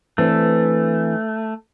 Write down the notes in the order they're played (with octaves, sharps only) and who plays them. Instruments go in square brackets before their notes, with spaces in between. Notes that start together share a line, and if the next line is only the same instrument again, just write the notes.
[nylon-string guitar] E3 C4 D4 [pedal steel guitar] A3